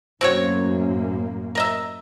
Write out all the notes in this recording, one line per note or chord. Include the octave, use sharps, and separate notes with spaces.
F#2 A2 A#3 C4 F#4 C#5
A#4 D#5 E5